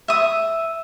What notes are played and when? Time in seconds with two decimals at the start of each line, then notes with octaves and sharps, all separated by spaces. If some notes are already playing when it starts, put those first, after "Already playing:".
0.08 E5 D#6